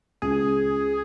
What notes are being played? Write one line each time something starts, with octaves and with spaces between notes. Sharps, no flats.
C#2 G#4